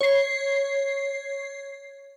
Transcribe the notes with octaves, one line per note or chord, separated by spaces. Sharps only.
C#5 C7